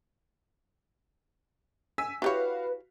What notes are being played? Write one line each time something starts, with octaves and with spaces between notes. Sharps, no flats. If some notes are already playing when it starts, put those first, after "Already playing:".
G#5 E6 B6
E4 F#4 G4 B4 C#5 F5